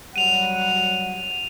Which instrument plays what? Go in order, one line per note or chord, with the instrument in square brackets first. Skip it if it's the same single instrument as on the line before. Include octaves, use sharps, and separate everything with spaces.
[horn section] F#3 G3 F#5 [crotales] D#7 F7